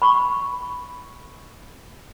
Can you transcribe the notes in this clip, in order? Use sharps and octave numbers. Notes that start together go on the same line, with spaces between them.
B5 C#6